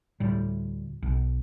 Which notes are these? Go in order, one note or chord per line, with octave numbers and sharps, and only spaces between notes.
D2 A2 G3
B1